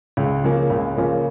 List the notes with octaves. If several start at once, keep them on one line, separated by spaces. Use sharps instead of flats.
C#2
C#3 F3 A#3
C#2
C#3 F3 A#3